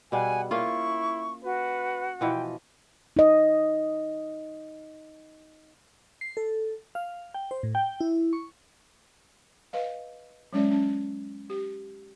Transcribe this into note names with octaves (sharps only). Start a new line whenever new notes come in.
B2 G3 G#4 F#5 G#5
A#3 C#4 E4 F4 C#6
F#4 B4
B2 E3 F3 G5
D#4 D#5
C7
A4
F5
G5
C5
A2
G5
E4
C#6
B4 D#5 F5
F#3 G#3 C#4 D5 E5
C#4
G4